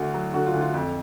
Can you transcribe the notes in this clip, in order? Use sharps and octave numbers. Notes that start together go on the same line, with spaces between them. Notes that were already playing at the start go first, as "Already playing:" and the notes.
Already playing: D2 F#4
F#3
D3 F#4
F4
D2
F4
F2